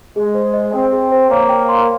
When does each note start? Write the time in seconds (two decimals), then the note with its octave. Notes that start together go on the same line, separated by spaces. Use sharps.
0.16 G#3 G#4
0.34 C5
0.54 D#5
0.73 C4 G#4
0.92 G#4
1.11 C5
1.30 A#3 C#5
1.49 G5
1.69 C6